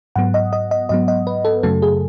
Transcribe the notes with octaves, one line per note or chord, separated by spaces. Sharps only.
G#2 F#3 B3 F#5
D#5
D#5
D#5
G#2 F#3 B3 D#5
D#5
B4
A4
F#2 C#3 F#3 A3 A4
G#4